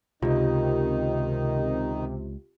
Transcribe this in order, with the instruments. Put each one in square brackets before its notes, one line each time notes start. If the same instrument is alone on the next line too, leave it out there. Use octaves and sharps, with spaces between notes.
[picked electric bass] C#2 [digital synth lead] C3 [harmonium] D#3 D#4 [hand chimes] F4 G4